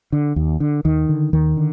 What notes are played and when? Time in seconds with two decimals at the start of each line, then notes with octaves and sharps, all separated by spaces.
0.12 D3
0.36 D#2
0.60 D3
0.85 D#2 D#3
1.09 D3
1.33 D#2 D#3
1.57 D3